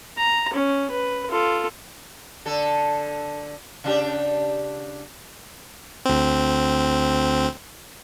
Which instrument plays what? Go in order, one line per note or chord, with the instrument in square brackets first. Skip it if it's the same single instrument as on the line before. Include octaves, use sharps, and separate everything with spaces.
[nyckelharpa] A#5
C#4
B4
F4 A4
[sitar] D3 A4
C#3 D4 G4
[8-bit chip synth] D2 C4